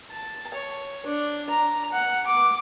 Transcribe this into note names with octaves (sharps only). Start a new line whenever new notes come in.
A5
C#5
D4
A#5
F#5
D6